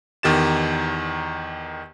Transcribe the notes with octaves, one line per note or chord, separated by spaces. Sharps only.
E2 D#3 G4 A6 E7